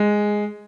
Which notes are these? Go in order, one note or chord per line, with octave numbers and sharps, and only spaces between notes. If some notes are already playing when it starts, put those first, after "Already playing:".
Already playing: G#3